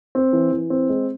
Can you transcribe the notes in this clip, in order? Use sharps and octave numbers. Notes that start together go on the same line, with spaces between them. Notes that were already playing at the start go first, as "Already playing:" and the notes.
C4
E3
E3
C4
G#3